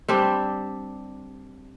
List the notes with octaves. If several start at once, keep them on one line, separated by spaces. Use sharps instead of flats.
G3 C4 D4